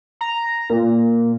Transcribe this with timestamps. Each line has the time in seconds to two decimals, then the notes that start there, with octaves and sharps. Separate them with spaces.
0.21 A#5
0.70 A#2